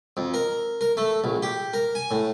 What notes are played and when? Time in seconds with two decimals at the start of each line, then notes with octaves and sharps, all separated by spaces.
0.17 F2
0.34 A#4
0.81 A#4
0.97 A3
1.24 A#1
1.43 G4
1.73 A#4
1.95 G#5
2.11 A2